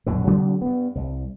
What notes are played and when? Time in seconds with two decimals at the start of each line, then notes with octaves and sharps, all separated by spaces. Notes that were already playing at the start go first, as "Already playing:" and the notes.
0.06 A#1 F#2 B2 D3
0.27 C#3 F#3 G3 B3
0.62 G2 B3
0.95 C2